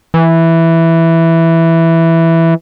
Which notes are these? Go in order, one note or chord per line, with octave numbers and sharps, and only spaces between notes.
E3